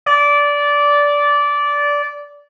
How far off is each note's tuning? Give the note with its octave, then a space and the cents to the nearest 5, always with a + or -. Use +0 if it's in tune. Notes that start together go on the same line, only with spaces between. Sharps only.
D5 -15